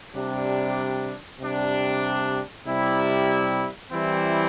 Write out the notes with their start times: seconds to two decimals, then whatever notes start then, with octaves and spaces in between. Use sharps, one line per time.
0.15 C3 G3 D4
1.40 C3 G3 D4
2.67 C3 G3 E4
3.92 E3 G3 C4 E4